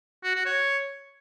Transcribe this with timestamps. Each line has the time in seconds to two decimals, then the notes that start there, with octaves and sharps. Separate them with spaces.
0.24 F#4
0.35 F#4
0.46 C#5